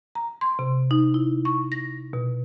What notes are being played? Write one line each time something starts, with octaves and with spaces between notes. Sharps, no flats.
A#5
C6
C3
D#4
E4
C#6
A#6
B2